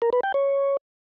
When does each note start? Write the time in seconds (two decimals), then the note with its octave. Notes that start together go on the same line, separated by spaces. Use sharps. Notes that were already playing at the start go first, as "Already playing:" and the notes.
0.02 A#4
0.13 B4
0.23 G5
0.34 C#5